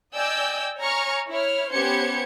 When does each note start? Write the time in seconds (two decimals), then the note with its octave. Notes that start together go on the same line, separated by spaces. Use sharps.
0.14 D5 D#5 G5 G#5 E6 G6
0.80 C#5 G#5 A#5 C#6 F6
1.30 E4 C#5 F6
1.72 B3 C#4 G4 C5 G#6 C#7